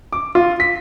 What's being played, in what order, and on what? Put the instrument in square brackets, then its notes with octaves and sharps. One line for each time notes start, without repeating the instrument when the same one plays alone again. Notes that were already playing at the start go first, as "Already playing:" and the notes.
[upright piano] D6
F4
B6